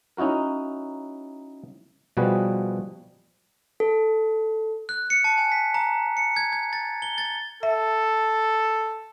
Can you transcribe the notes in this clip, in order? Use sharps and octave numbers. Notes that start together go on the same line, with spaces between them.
C#4 D#4 E4 F#4 A#4
B2 F3 G3 F#4 G#4 B4
A4
F#6
C#7
A5
G#5
B6
A#5
C#7
G#6
G#6
A6
G7
A6
A4 E5